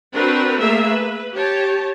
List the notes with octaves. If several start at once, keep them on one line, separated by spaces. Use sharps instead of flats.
C4 D4 F#4 A#4 B4
A3 A#3 G#4 A#4 E5
B4
G4 C#5 A5